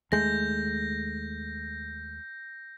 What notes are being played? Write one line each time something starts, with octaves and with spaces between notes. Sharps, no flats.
D#2 G#3 A3 G6 A#6